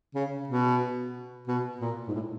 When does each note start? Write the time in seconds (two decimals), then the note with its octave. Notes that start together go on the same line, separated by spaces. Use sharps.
0.15 C#3
0.48 B2
1.48 B2
1.81 A#2
2.08 G#2
2.15 A2